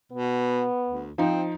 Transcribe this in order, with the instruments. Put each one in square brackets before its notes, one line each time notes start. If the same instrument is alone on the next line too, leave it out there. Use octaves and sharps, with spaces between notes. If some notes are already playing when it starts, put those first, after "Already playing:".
[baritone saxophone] B2 [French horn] B3
[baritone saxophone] D2
[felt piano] F3 D#4 [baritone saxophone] C4